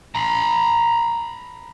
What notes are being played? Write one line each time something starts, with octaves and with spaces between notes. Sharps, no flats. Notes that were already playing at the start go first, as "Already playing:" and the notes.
A#5 B5